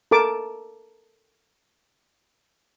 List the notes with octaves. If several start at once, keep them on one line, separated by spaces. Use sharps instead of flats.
A4 A#4 A5 D6